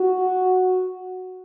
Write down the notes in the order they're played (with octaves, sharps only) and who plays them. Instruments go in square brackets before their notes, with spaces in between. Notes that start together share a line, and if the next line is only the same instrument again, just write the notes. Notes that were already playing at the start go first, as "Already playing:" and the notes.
Already playing: [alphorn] F#4